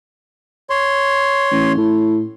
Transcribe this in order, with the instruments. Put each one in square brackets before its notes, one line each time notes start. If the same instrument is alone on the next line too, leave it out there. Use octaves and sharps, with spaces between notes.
[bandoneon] C#5 C6
[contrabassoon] A1
A2